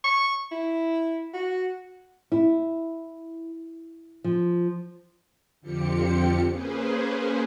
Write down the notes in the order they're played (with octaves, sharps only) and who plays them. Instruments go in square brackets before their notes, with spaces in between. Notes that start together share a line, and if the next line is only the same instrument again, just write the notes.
[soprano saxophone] C#6
E4
F#4
[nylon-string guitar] E4
F3
[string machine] F2 D3 F3 C4 G4 C#7
A#3 C#4 G#4 B4 C5